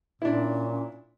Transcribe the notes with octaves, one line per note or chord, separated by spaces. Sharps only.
A#2 C#4 D4 E4